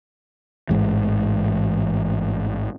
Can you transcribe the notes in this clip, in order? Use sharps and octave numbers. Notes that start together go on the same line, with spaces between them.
A1 G#2 E3